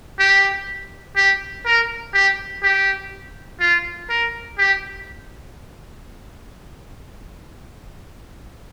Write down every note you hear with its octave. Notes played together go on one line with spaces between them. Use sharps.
G4
G4
A#4
G4
G4
F4
A#4
G4